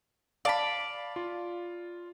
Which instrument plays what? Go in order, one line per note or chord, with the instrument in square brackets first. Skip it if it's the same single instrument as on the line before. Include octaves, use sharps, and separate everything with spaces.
[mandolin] D5 B5 [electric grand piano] F5 A5
[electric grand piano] F4